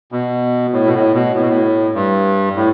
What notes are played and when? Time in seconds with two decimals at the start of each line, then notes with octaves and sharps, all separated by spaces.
0.12 B2
0.73 A2
0.86 B2
0.94 A2
1.14 B2
1.34 A2
1.41 B2
1.49 A2
1.94 G2
2.55 A2